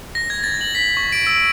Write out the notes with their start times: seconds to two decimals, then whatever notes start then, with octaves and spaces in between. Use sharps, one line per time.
0.15 A#6
0.30 G#6
0.44 A6
0.61 F#7
0.75 B6
0.97 C#6
1.12 D7
1.27 E6